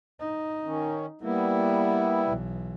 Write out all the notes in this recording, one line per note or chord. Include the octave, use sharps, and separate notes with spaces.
D#4
D#3 C#4
G3 A#3 B3 E4
B1 E3